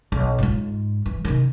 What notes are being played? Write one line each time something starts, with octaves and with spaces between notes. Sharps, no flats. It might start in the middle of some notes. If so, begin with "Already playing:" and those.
B1
G#2 F4
E3
C3 D#3